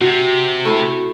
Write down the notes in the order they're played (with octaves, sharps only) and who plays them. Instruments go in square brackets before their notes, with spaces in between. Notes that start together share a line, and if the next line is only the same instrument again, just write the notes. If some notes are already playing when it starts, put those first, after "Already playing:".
[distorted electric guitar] C3 [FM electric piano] F#4
[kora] A3 E4 A4